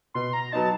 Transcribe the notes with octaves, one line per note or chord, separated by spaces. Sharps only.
B2 C6
A#5
F#3 B3 D#4 A5